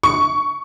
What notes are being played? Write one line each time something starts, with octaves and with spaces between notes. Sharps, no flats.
C#6